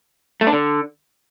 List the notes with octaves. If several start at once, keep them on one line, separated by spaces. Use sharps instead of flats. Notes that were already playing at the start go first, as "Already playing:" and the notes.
A3
D4
D3